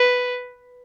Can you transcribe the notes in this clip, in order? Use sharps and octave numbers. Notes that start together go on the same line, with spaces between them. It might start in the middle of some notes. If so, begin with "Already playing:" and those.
Already playing: B4